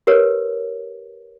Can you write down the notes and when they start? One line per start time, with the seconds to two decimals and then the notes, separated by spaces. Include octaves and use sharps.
0.07 G4 A#4 B4 C#5